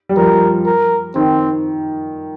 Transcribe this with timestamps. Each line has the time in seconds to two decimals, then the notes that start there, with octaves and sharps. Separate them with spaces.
0.09 G3
0.17 F3 A#4
0.66 A#4
1.15 D#3 C4